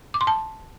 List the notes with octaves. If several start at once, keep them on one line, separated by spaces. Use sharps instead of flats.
D6
C6
A5